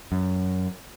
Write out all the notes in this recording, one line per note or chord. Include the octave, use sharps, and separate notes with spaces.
F#2